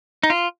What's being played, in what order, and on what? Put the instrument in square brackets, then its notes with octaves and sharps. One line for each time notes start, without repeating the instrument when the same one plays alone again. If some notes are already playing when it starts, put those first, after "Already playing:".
[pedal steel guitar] D#4
F4